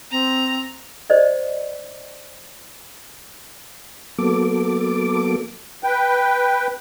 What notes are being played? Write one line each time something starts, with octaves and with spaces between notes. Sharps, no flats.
C4 A#5
C5 D5 D#5
F#3 A#3 B3 A4 D6
B4 G5